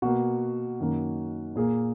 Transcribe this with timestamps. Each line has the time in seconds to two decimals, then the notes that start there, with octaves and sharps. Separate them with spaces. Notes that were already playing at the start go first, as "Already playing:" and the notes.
0.02 B2 A#3 F#4
0.80 F#2 D#3 A#3
1.56 A#2 A#3 G#4